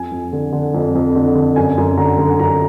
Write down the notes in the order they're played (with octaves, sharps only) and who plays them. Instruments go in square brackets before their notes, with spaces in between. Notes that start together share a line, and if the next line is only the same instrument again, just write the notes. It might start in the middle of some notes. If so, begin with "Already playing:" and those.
Already playing: [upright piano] F2 G#5
F2
D3
D3
F2
F2
D3
D3
F#2 G#5
F#2
D3 A#5
D3
F#2 A#5